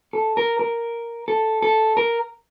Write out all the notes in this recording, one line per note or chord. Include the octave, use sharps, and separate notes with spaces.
A4
A#4
A#4
A4
A4
A#4